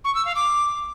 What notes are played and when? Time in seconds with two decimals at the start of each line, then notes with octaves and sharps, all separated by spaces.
0.05 C#6
0.15 E6
0.25 F5
0.36 D6